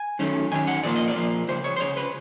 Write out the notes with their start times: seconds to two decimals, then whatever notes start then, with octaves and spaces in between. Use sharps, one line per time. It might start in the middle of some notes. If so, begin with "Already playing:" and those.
Already playing: G#5
0.19 F#2 D#3 F#3 A3 C#4
0.51 F#2 D#3 C#4 G#5
0.67 F#5
0.83 A#2 F3 A#3 D5
0.96 D#5
1.08 D5
1.16 A#2 F3 A#3
1.48 C#2 C#3 C5
1.64 C#5
1.76 C5
1.80 C#2 C#3 C#5
1.97 B4